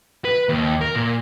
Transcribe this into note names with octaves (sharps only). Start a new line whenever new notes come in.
B4
D#2
A#4
A#2